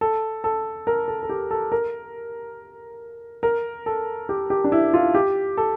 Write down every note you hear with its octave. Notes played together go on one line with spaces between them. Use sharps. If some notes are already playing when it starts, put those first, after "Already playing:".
A4
A4
A#4
A4
A4
G4
A4
A#4
A#4
A4
G4
G4
D4
E4
F4
G4
A4